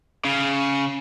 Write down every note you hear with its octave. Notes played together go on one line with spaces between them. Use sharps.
C#3